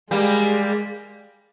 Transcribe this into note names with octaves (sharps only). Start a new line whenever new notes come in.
G3 G#3 A#3